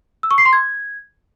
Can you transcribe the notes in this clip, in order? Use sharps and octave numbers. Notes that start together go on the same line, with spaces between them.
E6
C#6
C7
C6
G#6